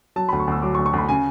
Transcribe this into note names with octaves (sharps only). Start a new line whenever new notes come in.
F#3 A5
D2 B5
C#6
D2 E6
F#3 D6
C#6
D2
C#6
D2 B5
C#3 G#5